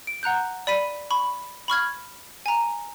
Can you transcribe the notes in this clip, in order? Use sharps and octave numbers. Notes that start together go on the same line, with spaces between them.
D7
F#5 A#5 F#6 G6
D5 B5 B6 D#7
B5 C#6
B5 C#6 F6 G#6
G#5 A#5